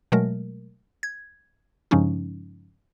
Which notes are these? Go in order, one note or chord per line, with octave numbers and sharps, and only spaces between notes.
B2 F#3 G#3 A3 A#4
G#6
G2 C#3 F3 G#3 C#4 D#4